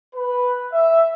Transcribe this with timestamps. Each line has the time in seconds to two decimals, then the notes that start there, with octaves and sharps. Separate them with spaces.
0.16 B4
0.72 E5